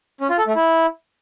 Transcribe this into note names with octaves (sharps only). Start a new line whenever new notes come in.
C#4
F4
A4
A3
E4